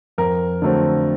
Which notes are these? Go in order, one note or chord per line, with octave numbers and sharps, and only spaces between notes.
F2 A#4
D3 F#3 A3 C4